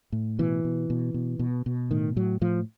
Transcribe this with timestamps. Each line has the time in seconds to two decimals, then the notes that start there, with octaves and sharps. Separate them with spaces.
0.12 A2
0.39 B2 E3
0.64 B2
0.90 B2
1.14 B2
1.39 B2
1.66 B2
1.91 A2 D#3
2.16 A2 F#3
2.41 A2 F3